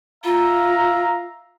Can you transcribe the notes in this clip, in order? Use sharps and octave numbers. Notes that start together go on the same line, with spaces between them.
F4 E5 F5 A#5